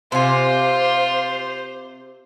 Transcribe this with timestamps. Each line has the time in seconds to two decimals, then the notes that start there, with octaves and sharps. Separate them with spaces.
0.12 C3 F4 C5 G#5